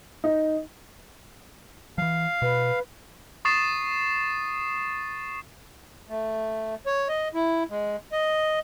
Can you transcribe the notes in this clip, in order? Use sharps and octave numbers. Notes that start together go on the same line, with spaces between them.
D#4
E3 F3 F5
B2 B4
C#6 D#6 A6 C7 E7
A3
C#5
D#5
E4
G#3
D#5